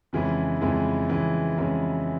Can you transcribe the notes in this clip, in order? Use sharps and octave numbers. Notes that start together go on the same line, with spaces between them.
F2 C#3 E3 G#3 B3
F2 C#3 E3 G#3 B3
F2 C#3 E3 G#3 B3
F2 C#3 E3 G#3 B3